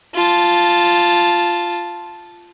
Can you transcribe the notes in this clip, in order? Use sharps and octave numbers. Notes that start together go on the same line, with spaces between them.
F4 A5